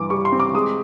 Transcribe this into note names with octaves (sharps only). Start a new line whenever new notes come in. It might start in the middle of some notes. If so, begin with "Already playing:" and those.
Already playing: G2 E3 D6
G3 C#6
C6
C4
D6
G#3 D#6